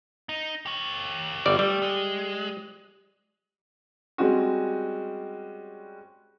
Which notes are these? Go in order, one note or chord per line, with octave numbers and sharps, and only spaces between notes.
D#4
G4 C#5
G1 G3 D5
G3 A3
G#3
G3 G#3 C4 C#4 F#4